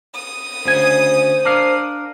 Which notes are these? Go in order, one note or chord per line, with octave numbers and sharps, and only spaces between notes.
D#6
D2 C#3 C5 G#5
D4 A#4 F5